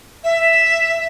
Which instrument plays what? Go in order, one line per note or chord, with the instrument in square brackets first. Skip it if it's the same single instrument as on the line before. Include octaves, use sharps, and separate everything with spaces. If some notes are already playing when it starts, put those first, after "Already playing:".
[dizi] E5